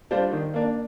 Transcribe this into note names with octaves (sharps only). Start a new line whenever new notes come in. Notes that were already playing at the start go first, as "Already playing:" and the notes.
G3 D4 F4 C5
D#3
A#3 D4